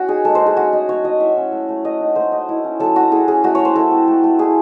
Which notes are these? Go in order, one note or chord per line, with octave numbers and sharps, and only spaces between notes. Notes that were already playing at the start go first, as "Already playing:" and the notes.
Already playing: C#4 F#4
D#4 G#4
G#3 A4
C5
D#4
G#4
C#4 F#4
A3 D#5
F#3 C#5
F#3 D#5
E4 E5
C#4
A3
A3
A3 D#5
D#4
A3 C5
D#4
E4
C#4
F#3 A4
F#3 F#4
E4 G#4
C#4 G#4
A3 F#4
A3 C#5
C5
E4 A4
C4
A3
A3
E4 G#4